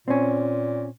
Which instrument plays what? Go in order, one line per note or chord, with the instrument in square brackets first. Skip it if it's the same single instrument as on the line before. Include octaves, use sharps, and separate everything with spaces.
[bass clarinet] A#2 [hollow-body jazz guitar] C4 C#4